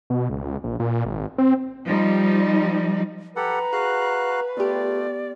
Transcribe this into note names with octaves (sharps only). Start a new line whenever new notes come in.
B2
C#2
A#1
A#2
G#1
C4
F3 G3 D#4
G4 A4 B4 F#5 A#5
F#4 G#4 F5 F#6
A3 B3 F4 G4 D5